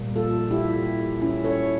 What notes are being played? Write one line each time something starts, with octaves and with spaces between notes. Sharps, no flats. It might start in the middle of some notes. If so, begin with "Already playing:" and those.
Already playing: A#2 G3 A#3
F4 A4
E4 G4
C#4 E4
A4 C#5